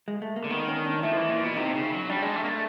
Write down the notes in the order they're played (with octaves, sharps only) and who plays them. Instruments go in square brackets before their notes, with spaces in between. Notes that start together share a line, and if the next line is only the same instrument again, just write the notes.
[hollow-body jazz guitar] G#3
A3
A#3
[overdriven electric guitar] D3
[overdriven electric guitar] D#3 [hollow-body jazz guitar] B3
[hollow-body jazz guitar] C#4
D4
[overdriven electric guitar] A3 [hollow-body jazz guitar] E4
[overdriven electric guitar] F3
E3
A#2
B2
[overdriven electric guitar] C3 [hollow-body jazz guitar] D#4
[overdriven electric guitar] C#3
F#3
[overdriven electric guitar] G3 [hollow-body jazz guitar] D4
[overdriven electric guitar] G#3
A3
A#3
A3